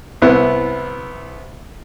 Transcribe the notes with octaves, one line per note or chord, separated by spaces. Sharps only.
C2 B3 E4